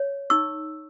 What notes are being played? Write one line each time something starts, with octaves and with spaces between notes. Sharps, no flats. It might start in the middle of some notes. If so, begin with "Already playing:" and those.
Already playing: C#5
D#4 C#6 E6